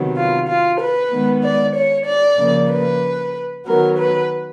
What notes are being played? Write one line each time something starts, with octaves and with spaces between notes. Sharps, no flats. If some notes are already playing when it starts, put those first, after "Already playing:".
Already playing: C3 D#3 F#3 B3
F4
F4
B4
D#3 G#3 B3
D5
C#5
D5
C#3 F3 A#3
B4
D#3 F#3 B3 A#4
B4